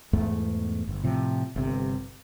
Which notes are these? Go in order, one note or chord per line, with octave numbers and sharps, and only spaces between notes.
E2 G#2 A3
G1
A2 C3 F3
G1 C3